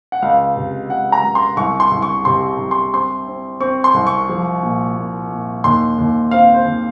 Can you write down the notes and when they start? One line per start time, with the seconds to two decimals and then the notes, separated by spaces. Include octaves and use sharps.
0.12 F#5
0.22 C#2 F5
0.56 C3
0.90 C#2 F#5
1.12 A#5
1.23 C#2
1.35 C6
1.57 C2 C#6
1.80 C6
1.92 C2
2.02 C#6
2.25 C3 C6
2.59 C2
2.71 C6
2.93 C4 C6
3.27 C4
3.60 C4 C#6
3.84 C6
3.94 C2
4.07 C#6
4.29 F3
4.63 A#2
4.97 A#2
5.30 A#2
5.64 D#2 C6
5.98 D#2
6.31 C4 F5
6.54 C5
6.66 D#2